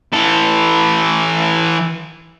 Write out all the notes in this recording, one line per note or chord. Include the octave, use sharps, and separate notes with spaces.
E3 A4